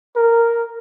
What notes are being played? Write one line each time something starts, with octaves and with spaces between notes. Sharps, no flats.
A#4